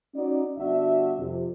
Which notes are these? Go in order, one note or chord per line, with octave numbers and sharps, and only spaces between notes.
C#4 D#4 F#4 D5
G1 D4 F#4 E5
F2 C3